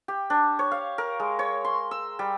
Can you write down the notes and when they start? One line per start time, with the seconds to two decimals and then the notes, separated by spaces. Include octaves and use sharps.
0.08 G4
0.30 D4
0.59 C#5
0.71 F5
0.98 A#4
1.20 G#3
1.39 C#5
1.65 C6
1.91 E6
2.19 G3